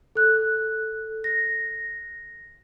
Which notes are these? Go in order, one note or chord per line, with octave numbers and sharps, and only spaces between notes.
A4 F#6
A#6